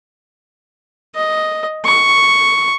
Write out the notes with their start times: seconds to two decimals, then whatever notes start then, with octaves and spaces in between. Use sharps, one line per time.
1.16 D#5
1.85 C#6